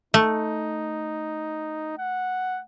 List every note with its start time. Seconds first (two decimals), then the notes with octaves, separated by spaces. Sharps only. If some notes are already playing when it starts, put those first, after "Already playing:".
0.14 A3 D#4
1.98 F#5